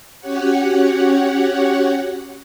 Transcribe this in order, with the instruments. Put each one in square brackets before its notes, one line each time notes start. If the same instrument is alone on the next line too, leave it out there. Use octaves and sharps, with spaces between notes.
[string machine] C#4 F#4 G4 C#5 F#5